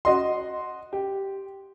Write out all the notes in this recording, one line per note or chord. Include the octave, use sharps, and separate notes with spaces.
F#4 D#5 C6
G4